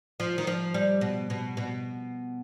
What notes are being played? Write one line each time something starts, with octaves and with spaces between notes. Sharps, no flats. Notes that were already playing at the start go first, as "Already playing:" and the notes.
F3
D#3
F3
G3
B2
B2
B2